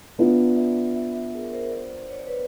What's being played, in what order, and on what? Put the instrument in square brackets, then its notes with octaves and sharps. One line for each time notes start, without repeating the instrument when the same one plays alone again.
[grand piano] B3 D4 F4 [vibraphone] D5 E5
[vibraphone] D5 E5
D5 E5
D5 E5
D5 E5
G#4 A#4
A#4 C5
C5 D5
C#5
D5
B4 C#5